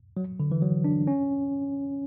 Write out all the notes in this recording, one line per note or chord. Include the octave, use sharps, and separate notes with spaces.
F#3
D3
E3
F#3
D4
C#4